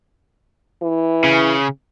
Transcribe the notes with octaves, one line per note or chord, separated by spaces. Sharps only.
E3
C#3